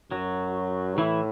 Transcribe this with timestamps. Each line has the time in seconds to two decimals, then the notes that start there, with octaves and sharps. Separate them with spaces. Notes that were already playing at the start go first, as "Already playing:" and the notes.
0.11 F#2 F#3 F#4
0.98 A2 E3 E4